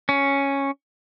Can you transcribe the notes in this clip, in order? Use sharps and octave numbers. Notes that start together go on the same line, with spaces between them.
C#4